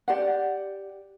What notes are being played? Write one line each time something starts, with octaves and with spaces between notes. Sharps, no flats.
G4 D5 F#5